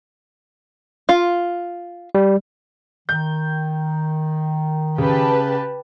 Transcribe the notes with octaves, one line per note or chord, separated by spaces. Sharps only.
F4
G3
D#3 G6
C#3 G4 B4 A5